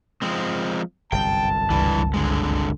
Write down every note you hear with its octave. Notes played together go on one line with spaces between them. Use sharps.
F3 G#3 C4
G1 C2 F#2 G5 A5
C#2 G2 E3
D3 G#3